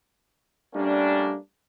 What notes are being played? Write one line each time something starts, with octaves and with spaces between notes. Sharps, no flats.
G3 A3 A#3 C#4 D4